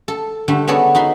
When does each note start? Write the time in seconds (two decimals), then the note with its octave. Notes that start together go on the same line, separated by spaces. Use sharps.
0.08 A4
0.48 D3 G3 A3
0.67 B3 F#4 G#4 A4 C#5 D5
0.95 D#4 F#4 B5 C6